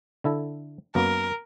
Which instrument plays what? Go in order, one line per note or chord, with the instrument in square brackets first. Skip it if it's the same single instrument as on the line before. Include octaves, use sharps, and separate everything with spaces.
[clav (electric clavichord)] D3 E4 A4
[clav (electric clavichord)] F#2 A#3 B3 [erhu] A#4